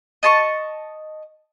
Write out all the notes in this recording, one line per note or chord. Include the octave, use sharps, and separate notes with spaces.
D#5 A5 C6 C#6